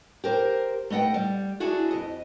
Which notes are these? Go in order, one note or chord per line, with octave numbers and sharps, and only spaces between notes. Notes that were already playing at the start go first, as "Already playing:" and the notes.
G4 A#4 C5
A3 B3 D#5 F#5 G5
G3
D4 E4 F#4 G#4
F2 D#5